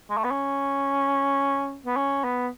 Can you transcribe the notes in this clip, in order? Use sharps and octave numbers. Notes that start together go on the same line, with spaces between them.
G#3
A3
B3
C#4
B3
C#4
B3